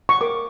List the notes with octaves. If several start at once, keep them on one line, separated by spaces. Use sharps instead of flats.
C#6
A#4 D6